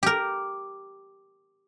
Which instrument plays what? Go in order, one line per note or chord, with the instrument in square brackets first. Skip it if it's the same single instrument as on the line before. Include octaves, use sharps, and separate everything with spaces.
[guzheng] G4 A#4